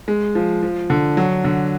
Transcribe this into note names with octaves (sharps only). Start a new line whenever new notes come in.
G#3
F3
F3
D3
F#3
D3